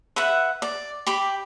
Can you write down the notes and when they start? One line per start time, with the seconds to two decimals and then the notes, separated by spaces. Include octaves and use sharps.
0.16 B4 E5 F#5
0.62 D5
1.07 G4 B5 D6